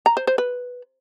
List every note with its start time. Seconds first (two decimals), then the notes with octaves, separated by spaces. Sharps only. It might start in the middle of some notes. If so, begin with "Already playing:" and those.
0.06 A#5
0.17 C5
0.27 C5
0.38 B4